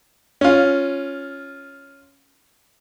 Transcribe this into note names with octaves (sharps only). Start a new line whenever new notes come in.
C#4 F4